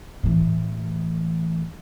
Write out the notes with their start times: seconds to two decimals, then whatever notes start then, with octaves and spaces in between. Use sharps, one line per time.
0.23 A2 E3